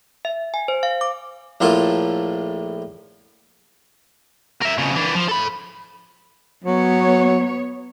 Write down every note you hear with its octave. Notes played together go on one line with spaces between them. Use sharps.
E5
G#5
C5
F5
D6
A#1 A2 A#3 F4 A4
A#4 E5
F2 C#3
E3 D4
F3
A4 B5
F#3 B3 C#5